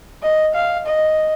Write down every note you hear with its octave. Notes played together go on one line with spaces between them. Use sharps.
D#5
F5
D#5